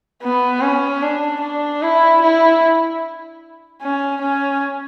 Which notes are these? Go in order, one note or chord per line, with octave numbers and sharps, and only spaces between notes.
B3
C#4
D4
D4
E4
E4
C#4
C#4